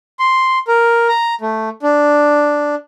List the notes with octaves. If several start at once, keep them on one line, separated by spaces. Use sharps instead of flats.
C6
A#4
A#5
A3
D4